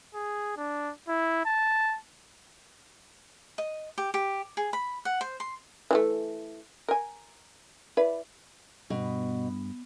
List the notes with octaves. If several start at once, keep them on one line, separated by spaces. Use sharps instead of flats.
G#4
D4
E4
A5
D#5
G4
G4
G#4
B5
F#5
C5
C6
E3 G3 A3
A#4 G#5
E4 B4 D5
G2 B2